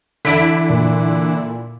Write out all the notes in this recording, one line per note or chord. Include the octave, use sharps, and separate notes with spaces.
D3 E3 D4 E4 B6 D7
A#2